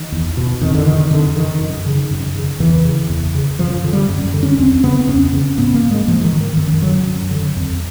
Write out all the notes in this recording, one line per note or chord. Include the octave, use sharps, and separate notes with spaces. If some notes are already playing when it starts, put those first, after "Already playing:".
Already playing: D#3
E2
B2
F2 D#3
D3
D3 D#3
F2 D3
D3 D#3
F#2
C#3
F#2
C#3
E2 E3
C#3
E2
C#3
F#2 F3
D3
G3
F#2
D3
C#4
E2 C4
C#3 B3
C4
E2 C#4
C#3
G#2 B3
A#3
G#3
G#2 F3
D#3
D#3
F#2 D#3
D3 F#3
F#2
D3
F2